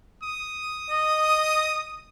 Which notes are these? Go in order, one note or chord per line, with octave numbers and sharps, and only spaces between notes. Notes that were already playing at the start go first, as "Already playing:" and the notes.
D#6
D#5